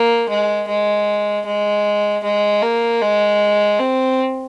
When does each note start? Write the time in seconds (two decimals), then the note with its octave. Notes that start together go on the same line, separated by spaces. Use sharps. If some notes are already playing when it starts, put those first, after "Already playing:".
Already playing: A#3
0.29 G#3
0.68 G#3
1.46 G#3
2.23 G#3
2.62 A#3
3.01 G#3
3.79 C4